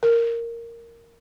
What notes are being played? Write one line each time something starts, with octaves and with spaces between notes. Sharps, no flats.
A#4